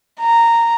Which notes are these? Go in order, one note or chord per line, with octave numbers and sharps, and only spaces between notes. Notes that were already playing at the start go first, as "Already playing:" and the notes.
A#5